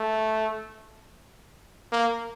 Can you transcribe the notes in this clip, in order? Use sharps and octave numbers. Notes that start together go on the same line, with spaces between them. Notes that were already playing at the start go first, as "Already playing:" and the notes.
Already playing: A3
A#3